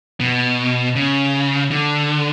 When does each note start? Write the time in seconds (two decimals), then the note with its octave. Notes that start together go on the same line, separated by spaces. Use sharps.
0.20 B2
0.95 C#3
1.71 D3